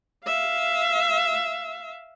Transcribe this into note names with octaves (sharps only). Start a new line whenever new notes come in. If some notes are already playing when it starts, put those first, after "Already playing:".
E5 F5